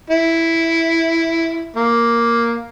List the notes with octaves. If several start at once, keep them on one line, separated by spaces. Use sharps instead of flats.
E4
A#3